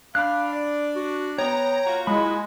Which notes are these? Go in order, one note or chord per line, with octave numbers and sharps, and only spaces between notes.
D4 F5 B5 F#6
D5
F#4
B3 C#5 G5 A#5
A#3 F4 F#4
G#3 E4 B5